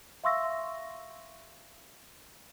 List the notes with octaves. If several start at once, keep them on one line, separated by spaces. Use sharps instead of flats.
E5 F5 C6 C#6 E6 A#6